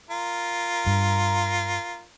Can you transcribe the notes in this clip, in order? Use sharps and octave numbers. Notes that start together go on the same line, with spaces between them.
F4 A#4
G2